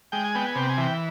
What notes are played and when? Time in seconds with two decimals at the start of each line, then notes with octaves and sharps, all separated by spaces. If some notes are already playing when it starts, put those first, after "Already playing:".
0.12 G#3 G5
0.25 G#5
0.35 B3 G5
0.47 G#5
0.55 C3 G5
0.69 G#5
0.77 E3 G5